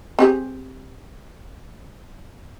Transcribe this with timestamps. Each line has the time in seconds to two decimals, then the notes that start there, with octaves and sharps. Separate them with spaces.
0.19 C4 G4 G#4